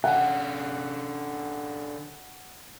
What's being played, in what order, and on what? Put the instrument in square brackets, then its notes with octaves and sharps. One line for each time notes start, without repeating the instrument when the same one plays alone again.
[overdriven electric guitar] D3 C#4 [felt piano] F#5